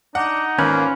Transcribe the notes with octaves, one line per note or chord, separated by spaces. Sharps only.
D4 D#4 F#5
G#1 A#3 C#4 F4 B4